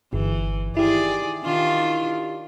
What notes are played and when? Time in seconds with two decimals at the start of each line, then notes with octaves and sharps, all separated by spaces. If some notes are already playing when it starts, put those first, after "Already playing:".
0.13 G1 E3
0.77 D#3 E4 G4 G#4 D5
1.44 D#3 D4 F4